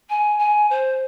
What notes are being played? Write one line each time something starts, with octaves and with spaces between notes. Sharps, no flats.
G#5
G#5
C5